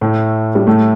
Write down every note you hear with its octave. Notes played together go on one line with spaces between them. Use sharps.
A2 A3
G3
A2 A3